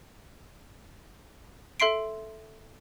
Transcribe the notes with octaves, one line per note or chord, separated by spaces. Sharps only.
A4 E5 C6 C7 D7